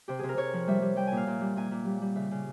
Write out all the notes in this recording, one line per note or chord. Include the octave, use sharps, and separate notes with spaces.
C3 G4
C3 G#4
A#4
C3 C#5
F3
G3 E5
G3
G3 G5
A#2 G#5
F5
A#2
G3
A#2 G#5
A#2
G3
G3
C#3 E5
C#3